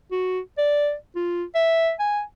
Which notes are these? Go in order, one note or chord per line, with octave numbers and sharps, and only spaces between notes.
F#4
D5
F4
E5
G#5